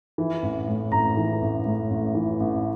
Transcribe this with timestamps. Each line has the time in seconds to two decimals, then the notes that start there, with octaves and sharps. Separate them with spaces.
0.18 E3
0.43 A1
0.68 A2
0.92 A1 A#5
1.17 E3
1.42 A1
1.66 A2
1.90 A1
2.15 E3
2.40 A1